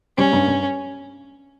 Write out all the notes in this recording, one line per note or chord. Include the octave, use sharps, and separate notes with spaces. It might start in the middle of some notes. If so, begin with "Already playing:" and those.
G3 C#4
G2
G2